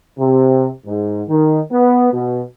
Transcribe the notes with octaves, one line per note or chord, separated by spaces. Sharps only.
C3
G#2
D#3
B3
B2